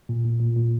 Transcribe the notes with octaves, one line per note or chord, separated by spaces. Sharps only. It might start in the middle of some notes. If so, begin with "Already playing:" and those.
A#2
A#2
A#2
A#2